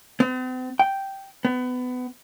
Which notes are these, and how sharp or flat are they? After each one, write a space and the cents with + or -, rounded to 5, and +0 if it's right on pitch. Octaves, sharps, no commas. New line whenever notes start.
C4 -45
G5 -5
B3 +25